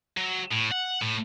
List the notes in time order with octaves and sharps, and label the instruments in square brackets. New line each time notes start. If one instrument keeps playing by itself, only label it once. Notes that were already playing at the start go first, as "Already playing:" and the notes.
[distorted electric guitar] F#3
A2
F#5
A2